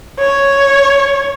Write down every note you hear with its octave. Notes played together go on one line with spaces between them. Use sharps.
C#5